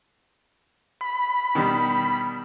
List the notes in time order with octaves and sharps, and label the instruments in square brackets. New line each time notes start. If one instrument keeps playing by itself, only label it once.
[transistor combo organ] B5
[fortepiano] B2 D#3 G3